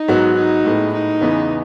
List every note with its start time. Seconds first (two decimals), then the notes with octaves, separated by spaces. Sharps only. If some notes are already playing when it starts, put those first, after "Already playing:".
Already playing: D#4
0.08 G#2 F#3 B3 F#4
0.36 D#4
0.65 A2 G#3 B3
0.93 D#4
1.21 E2 C#3 E3 B3